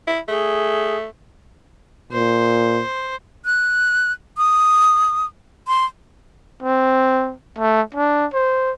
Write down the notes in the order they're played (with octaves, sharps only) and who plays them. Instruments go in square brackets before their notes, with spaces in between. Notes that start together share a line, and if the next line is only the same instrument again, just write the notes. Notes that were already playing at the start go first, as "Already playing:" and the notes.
[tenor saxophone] E4
[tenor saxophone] A3 [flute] G#4
[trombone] A#2 [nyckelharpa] C5
[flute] F#6
D#6
C6
[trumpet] C4
A3
D4
C5